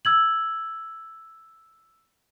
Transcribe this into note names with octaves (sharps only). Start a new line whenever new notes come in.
E6 G#6 F#7